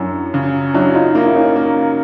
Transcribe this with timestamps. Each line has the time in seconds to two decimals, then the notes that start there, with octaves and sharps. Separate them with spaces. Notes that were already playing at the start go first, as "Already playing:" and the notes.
Already playing: F#2 F#3 D4 E4
0.34 C#3
0.74 F#3 D4 E4
0.95 D#4 F4
1.15 A#3 D4 E4
1.27 E4
1.36 C#4 D#4
1.56 A#3